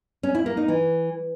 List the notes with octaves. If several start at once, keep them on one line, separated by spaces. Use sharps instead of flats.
C#4
E4
A#3
D#4
E3